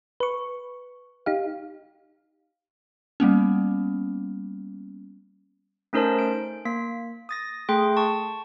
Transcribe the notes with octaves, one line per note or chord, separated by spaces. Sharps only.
B4 C#6
D#4 G4 F5
G3 A#3 B3 C#4
A3 C#4 D#4 A#4 C5 A5
D7
A#3 B6
D#6 A6 A#6
A3 G#4 G5 C6
A5 C#6